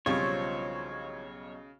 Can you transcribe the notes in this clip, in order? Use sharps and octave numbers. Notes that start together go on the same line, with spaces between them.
B1 C#3 F3 G3 C4 F4 C#5 C#6